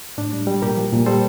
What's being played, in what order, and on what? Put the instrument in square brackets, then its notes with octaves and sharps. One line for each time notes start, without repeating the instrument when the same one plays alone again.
[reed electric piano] A2 D4
G3
G3
A#2 G4 A#4
F3
A#2
G3 A4 C5